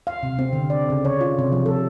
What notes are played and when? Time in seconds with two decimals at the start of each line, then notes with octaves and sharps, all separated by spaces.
0.07 F5
0.23 C3
0.39 C4
0.53 D3
0.70 D5
0.90 C#3
1.05 C#5
1.21 F4
1.39 C3
1.52 F3
1.66 A4